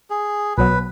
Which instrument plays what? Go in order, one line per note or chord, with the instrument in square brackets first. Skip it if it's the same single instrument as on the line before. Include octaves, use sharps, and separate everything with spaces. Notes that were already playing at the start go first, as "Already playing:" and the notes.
[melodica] G#4
[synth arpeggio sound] B1 B2 F#3 B3 [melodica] B4